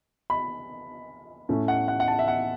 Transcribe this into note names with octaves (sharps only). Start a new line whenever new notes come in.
B5
A2 A3 C#4
F#5
F#5
F#5
A5
E5
F#5